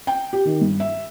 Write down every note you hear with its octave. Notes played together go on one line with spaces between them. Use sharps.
G5
G4
D#3
G2
E5